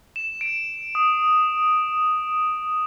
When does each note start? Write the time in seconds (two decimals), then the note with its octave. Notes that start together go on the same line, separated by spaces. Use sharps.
0.16 E7
0.41 D7
0.95 D#6